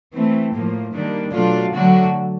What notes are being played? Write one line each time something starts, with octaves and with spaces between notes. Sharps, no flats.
E3 A3 C4
A2 F3 A#3
D#3 G3 A#3 D4
B2 F#3 A3 D4 F4
D3 F#3 A3 D4 F#4